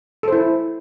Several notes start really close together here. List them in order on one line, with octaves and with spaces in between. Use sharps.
A4 C5 E4